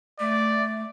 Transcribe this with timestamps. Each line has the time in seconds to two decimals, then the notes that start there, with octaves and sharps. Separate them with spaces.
0.20 A3 D5